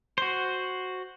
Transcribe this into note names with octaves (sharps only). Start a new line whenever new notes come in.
F#4 C5